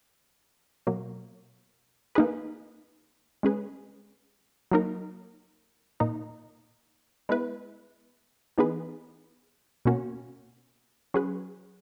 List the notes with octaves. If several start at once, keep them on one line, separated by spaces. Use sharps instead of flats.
B2 F#3 A#3
A#3 D#4 G#4 B4
G#3 C#4 G#4 B4
F#3 A#3 D#4 A#4
A#2 A#3 D#4
G#3 B3 E4 B4
E3 B3 D#4 G#4 B4
B2 A#3 C#4 F#4
F#3 C#4 G#4 B4